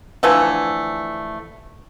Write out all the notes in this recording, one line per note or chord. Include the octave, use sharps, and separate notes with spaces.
D3 E3 F3 A3